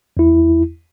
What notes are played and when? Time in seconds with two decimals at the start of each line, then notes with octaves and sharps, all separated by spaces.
0.17 E2 E4